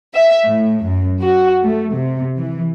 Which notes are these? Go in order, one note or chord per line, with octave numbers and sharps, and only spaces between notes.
E5
A2
F#2
F#4
A3
C3
E3